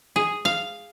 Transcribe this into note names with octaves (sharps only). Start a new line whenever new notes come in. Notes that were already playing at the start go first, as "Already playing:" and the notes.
G#4
F5